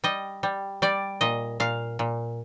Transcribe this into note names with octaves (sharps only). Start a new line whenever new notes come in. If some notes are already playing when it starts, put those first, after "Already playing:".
G3 D#5
G3
G3 D5
A#2 D#5
A#2 F5
A#2